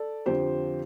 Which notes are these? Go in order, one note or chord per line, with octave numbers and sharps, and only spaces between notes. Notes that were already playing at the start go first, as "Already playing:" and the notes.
Already playing: A4 D5
F2 D3 F3 G4 C5